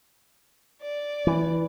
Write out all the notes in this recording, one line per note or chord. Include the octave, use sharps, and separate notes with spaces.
D5
E3